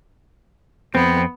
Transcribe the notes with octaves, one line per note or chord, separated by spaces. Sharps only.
F2 B3 C4